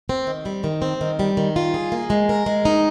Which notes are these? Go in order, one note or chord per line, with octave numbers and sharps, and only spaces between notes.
C4
D#3
G3
D#3
C4
D#3
G3
D#3
F4
G#4
A#3
G#3
A#4
G#3
D#4